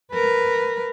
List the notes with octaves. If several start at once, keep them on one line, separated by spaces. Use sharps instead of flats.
A#4 B4